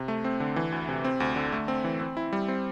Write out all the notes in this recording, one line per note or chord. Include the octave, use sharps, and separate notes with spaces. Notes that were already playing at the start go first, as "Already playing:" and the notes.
Already playing: C3
A3
C4
D3
E3
D2
C3
C4
D2
D3
A3
C4
E3
C4
E4
G3
C4